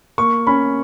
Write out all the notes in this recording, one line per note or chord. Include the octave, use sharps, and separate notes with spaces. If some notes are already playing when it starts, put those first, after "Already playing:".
A#3 C#6
C#4 B5